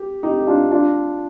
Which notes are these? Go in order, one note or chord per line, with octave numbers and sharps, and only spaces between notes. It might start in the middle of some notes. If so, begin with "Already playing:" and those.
Already playing: G4
D#4 G4
G4
D4 F4
D4 F4